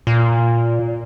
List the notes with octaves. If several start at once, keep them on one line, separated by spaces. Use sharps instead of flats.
A#2